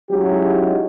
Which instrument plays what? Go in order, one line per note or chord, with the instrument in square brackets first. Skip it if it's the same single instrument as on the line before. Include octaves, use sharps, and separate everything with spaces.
[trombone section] F#3 G#3 C#4 D#4 E4 G4